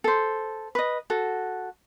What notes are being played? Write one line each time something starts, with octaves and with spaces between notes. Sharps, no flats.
A4 C5
B4 D#5
F#4 A4